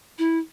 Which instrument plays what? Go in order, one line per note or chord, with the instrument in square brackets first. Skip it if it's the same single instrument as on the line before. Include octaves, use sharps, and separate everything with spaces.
[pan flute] E4